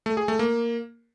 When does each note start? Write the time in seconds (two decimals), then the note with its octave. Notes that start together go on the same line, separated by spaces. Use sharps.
0.06 A3
0.17 G#4
0.28 A3
0.39 A#3